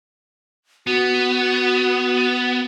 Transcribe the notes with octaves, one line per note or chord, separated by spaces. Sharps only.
B3 F#4